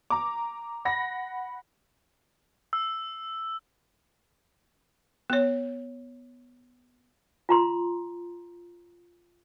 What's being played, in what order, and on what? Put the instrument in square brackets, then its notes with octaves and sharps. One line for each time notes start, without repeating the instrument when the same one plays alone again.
[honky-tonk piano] A#5 D6
F#5 B5 A#6
[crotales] E6
[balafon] B3 C#5
[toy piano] F4 A#5 C6